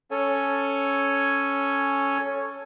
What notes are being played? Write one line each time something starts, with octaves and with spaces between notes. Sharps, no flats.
C#4 A4 C#5 G#5